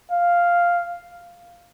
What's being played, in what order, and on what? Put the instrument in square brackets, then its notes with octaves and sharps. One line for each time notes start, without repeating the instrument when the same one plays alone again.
[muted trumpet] F5